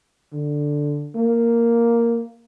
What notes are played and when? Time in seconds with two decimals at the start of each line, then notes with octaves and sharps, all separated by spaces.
0.34 D3
1.16 A#3